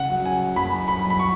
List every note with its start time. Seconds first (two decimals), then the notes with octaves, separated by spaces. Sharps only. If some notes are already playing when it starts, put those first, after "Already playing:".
Already playing: C#3 F#5
0.09 F#3
0.26 G#5
0.56 F#2 B5
0.88 B5
1.05 F#2
1.10 B5
1.19 C#6